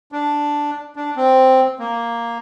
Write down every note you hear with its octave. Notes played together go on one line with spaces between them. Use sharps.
D4
D4
C4
A#3